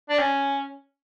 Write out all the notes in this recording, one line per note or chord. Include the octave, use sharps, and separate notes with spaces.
D4
C#4